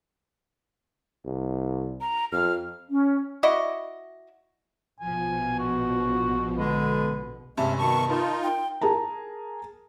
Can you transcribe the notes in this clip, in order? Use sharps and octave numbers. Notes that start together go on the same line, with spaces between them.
C2
A#5
F2 F6
C#4
E4 F#4 D5 D#5
A#1 B2 F3 G#5
F#4
D3 G#3 B4
G2 C3 G#3 C#4 E5
B2 D#3 A5 C#6
D#4 F4 A#4
G5
G#4 A#4 A5 A#5